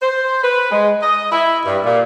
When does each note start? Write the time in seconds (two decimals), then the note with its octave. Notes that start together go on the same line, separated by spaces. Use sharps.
0.02 C5
0.43 B4
0.71 G#3
1.01 D#5
1.31 E4
1.65 G2
1.84 A#2